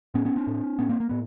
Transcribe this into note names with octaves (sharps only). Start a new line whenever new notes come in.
A2 B3 C#4
B3 C#4
C4 D4
A2
A2 B3 C#4
A#3 C4
A#3
A2 B3